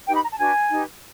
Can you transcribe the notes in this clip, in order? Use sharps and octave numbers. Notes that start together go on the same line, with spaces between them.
D#4 G4 B4 G5
B5
A#5
A5
D4 F#4 B4 G#5
D#4 G4 B4